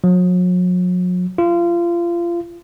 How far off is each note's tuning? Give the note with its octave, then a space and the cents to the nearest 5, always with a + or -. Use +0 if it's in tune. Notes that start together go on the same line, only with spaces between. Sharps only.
F#3 -40
F4 -30